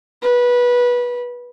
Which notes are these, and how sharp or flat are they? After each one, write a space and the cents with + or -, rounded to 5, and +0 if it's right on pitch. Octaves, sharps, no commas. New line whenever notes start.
B4 -20